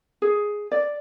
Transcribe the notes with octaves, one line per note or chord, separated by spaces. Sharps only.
G#4
D5